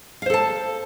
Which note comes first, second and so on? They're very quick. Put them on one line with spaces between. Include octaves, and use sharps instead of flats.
F5 C5 A4 A5